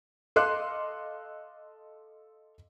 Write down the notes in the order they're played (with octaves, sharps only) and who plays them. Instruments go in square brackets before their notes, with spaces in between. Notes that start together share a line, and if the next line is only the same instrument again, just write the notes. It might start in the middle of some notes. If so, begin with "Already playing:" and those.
[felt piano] A4 D#5 F5 C6 D6 F#6